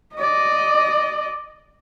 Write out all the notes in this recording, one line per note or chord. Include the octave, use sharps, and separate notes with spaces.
D5 D#5